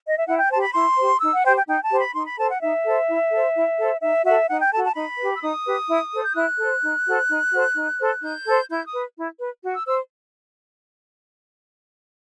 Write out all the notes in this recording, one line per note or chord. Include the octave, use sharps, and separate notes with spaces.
D#5
E5
E4 F#5
G5
G4 C5 A5
B5
E4 C6
G4 C5
D#4 E6
F#5
G4 C5 G5
G5
D#4 G5
A5
G4 C5
B5
D#4 C6
B5
A4 C5 A5
F#5
D#4 E5
A4 C5
E4
A4 C5
E4
A4 C5
D#4 E5
F#4 A4 E5
D#4 F#5
G5
F#4 A4 A5
A5
D#4 B5
G4 B4
E6
D#4 D#6
G4 B4
E4
A4 C5
G6
E4 F#6
A4 C5
D#4
F#4 A4 C5
D#4
F#4 A4 C5
D#4
A4 C5
D#4 G6
A4 C5
E4 G6
D#6
B4
E4
B4
F#4
E6
C5 E6